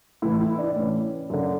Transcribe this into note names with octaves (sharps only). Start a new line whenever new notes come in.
A2 E3 E4
E4
D4
A2 E3 C#4
F#2 D3